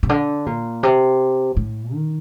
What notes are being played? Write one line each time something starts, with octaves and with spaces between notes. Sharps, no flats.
C3
D3
A#2
C3
A2
D#3